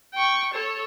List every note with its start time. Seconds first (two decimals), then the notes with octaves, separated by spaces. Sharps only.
0.14 G5 C#6
0.53 A4 C#5